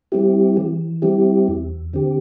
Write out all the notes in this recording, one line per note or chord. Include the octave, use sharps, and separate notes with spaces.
G3 C4 E4 G4
E3
G3 C4 E4 G4
E2
D3 C4 G4